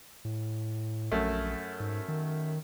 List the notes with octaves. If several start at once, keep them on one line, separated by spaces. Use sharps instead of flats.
A2
A#1 F#2 A3
G#2
D#3